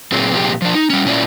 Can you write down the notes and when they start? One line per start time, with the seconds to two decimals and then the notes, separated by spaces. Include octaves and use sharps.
0.12 A#2 F#3 C4 G#4
0.33 A#2 F3 C4 E4 G4 G#4
0.62 F3 D4
0.75 D#4
0.90 G3 C#4
1.05 A#2 C#4 E4 D5